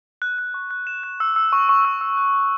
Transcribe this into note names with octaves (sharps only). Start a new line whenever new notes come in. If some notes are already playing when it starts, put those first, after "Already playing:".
F#6
F#6
C#6
F#6
E7
F#6
E6
E6
C#6
C#6
E6
E6
F#6
F#6